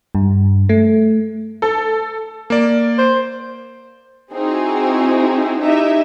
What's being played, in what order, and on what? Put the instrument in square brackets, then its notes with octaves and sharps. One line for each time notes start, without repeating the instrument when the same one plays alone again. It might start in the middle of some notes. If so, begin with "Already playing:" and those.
[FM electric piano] G2
A3
[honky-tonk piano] A4
[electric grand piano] A#3 D5
[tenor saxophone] C5
[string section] C4 D#4 E4 F#4 G#4
D#4 E4 G4 D#5 E5